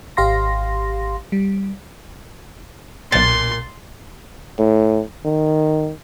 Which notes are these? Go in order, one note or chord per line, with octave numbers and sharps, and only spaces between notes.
G#1 G4 F5 C6 A#6
G3
B1 A#2 C6 A6
A2
D#3